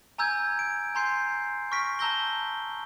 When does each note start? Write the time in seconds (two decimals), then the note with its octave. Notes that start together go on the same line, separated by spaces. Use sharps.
0.18 G#5 A#5 E6 G6 G#6
0.59 D7
0.95 G#5 A#5 C6 G6 C7
1.72 C#6 F6 A#6 B6 D7
1.99 A5 A#5 E6 G6 A#6 G7